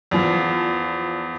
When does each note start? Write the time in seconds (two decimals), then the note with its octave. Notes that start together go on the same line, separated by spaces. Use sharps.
0.11 E2 F3